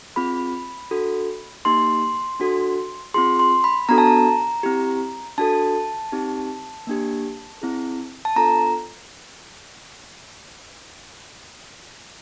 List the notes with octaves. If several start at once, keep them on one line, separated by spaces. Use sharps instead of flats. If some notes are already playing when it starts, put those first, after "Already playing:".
C4 F4 G#4 B5
D4 F#4 A4
A#3 D#4 G4 C6
D4 F#4 A4
C4 F4 G#4 C6
C6
B5
B3 D4 F#4 A4 A#5
A5
A#5
C4 E4 G4
D4 F#4 A4 A5
C4 D#4 G4
A#3 D4 G4
C4 E4 G#4
A5
B3 D4 F4 A4 A#5